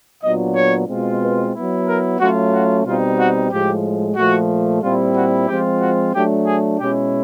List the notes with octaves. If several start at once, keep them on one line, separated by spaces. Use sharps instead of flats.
A#2 F#3 B3 D4 F4 D#5
C#5
B2 G#3 C4 F4
B4
F#3 B3 E4
A#4
F#3 A3 C#4 F4 F#4
F#4
B2 G3 C4 D#4 F4
F#4
A2 F3 G#3 G4
A#2 F3 A3 F#4
A#2 G3 C4 E4 F4
F#4
F3 G#3 C4 F4 G4
F#4
F#3 A3 D4 G4
G#4
B2 G#3 C#4 E4 G4